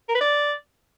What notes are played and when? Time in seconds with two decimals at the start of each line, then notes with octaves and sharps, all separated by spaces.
0.09 A#4
0.15 B4
0.21 D5